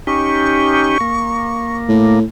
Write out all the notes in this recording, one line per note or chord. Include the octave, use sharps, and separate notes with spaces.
C#4 D#4 G4 C#6
A#3
A2